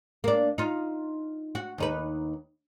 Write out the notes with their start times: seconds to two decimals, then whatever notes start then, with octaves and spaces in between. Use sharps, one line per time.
0.24 A#3 D4
0.58 D#4 F4
1.55 F#4
1.78 D#2 D#4 B4